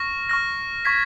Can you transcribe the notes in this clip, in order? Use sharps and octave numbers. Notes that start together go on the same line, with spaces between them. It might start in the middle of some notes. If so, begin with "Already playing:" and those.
Already playing: C#6 F6 A#6
C#6 F6 A#6
C#6 G#6 B6